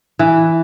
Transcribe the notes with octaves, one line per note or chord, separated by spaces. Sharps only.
E3